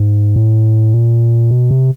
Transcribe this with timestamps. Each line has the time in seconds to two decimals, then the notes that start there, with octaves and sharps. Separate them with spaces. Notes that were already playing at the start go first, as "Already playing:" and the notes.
Already playing: G#2
0.36 A2
0.94 A#2
1.51 B2
1.71 C3